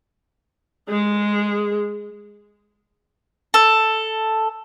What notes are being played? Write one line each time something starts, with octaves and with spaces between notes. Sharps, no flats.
G#3 G#4
A4